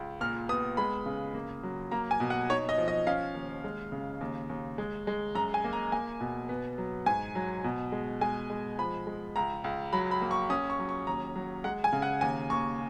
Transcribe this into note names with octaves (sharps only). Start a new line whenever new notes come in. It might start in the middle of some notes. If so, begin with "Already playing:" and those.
Already playing: C#2
A#2 F6
B3 D#6
G#3 B5
C#3
A#3
F#3
A#3 A#5
G#5
B2
F#5
D#4 C#5
D#5
F3
D#5
C#4 F5
D#2
G#3
C#3
D#2
D#2
G#3
G#3
F#2 A#5
G#5
A#3
A#5
A#3 G#5
B2
B3
F#3
G#2 G#5
F#3
B2
G#3
G#3 G#5
G#3
F3 B5
G#3
C#2 A#5
C#2
F#3 B5
B5
A#3
C#6
C#4 D#6
C#6
F#3
C#6
D#2 A#5
F#3
G#3 F#5
G#5
C#3
F#5
D#2 G#5
D#2 C#6